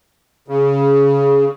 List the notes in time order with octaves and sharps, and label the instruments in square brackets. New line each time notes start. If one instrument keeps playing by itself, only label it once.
[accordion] C#3